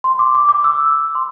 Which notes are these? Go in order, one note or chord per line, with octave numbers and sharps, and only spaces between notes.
C6
D6
D6
D6
E6
C6